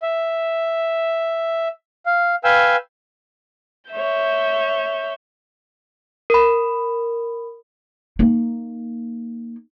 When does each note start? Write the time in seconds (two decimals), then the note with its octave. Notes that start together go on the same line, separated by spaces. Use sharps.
0.03 E5
2.06 F5
2.44 B4 F5 G5 G#5 E6
3.91 C#5 E5 G6
6.30 A#4 B5
8.19 A#3 D#4